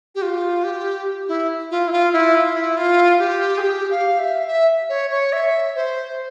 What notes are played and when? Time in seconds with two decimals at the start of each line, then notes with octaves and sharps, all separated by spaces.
0.15 G4
0.22 F4
0.64 G4
1.28 E4
1.71 F4
1.88 E4
1.92 F4
2.13 E4
2.35 F4
2.56 E4
2.77 F4
3.19 G4
3.58 G#4
3.62 G4
3.91 F5
4.19 E5
4.47 E5
4.89 C#5
5.11 C#5
5.33 E5
5.75 C5